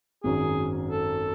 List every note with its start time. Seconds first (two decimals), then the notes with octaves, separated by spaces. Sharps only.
0.23 G#1 F#2 D#3 F#3 G#4
0.91 A4